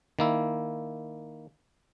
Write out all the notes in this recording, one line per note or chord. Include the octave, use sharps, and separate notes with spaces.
D#3 A#3 E4